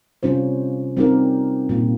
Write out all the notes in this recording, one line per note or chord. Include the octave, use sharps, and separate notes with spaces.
C3 G3 C#4 F4 C5
G3 C4 D#4 G4 A#4
A#2 G3 A#3